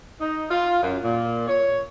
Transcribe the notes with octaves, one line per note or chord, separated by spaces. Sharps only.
D#4
F4
F#2
A#2
C#5